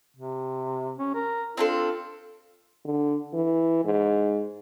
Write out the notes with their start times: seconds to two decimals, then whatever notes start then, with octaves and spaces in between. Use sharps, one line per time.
0.17 C3
0.99 C#4
1.14 A#4
1.57 C4 D4 F4 A4
2.85 D3
3.34 E3
3.85 G#2